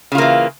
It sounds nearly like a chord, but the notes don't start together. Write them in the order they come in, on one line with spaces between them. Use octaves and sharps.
C#3 F4 A#3 E3